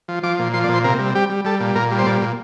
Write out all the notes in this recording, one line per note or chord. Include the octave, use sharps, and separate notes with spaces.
F3
F3 D6
A#2
F3 C6
D5
A#2
C5
C3 A#4
G3
G3 G4
G3
G3 A4
A#2
A#2 A#4
G3
C5
A#2 D5
A#2